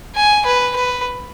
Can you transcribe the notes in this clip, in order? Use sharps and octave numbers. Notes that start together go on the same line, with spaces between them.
G#5
B4
B4